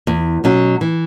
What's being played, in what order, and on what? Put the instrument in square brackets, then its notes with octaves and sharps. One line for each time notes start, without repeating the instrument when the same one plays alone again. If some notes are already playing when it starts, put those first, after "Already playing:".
[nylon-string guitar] E2
B2 F#3 C#4 F#4
E3